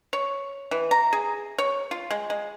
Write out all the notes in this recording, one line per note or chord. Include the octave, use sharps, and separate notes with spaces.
C#5
E3
A#5
G#4
C#5
F4
G#3
G#3